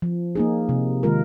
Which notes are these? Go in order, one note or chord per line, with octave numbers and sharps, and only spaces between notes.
F3
A#3 D#4 G#4
C3
D#3 G#3 F4 A#4